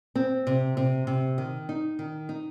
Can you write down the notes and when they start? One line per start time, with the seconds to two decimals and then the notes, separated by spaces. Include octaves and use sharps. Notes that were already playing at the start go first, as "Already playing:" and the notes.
0.16 C4
0.47 C3
0.77 C3
1.07 C3
1.38 D#3
1.69 D#4
1.99 D#3
2.29 D#4